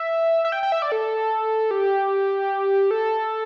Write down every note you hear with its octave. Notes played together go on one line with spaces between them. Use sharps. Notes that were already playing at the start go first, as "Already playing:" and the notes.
Already playing: E5
E5
G5
G5
E5
D5
A4
G4
A4